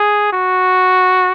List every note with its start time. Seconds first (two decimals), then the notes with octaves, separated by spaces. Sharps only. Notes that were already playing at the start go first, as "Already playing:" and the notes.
Already playing: G#4
0.33 F#4